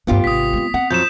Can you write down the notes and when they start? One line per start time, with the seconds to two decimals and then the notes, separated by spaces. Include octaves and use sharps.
0.07 D2 G2 B3 F4 G4
0.24 G#1 C3 D#6 B6
0.53 G#3 C4
0.74 C4 F#5
0.90 F2 F#3 G6 E7